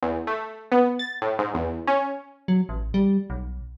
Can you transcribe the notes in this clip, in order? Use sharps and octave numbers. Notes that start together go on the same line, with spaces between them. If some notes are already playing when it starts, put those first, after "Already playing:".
E2
A3
B3
A6
A2
G#2
E2
C#4
F#3
A1
G3
B1